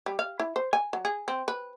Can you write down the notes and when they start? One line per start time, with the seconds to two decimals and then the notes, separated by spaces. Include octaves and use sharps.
0.06 G3
0.19 F5
0.40 E4
0.56 C5
0.73 G#5
0.93 F#3
1.05 G#4
1.28 C4
1.48 B4